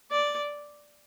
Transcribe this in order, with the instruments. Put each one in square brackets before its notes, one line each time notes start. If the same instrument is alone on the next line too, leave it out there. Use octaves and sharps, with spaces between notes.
[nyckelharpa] D5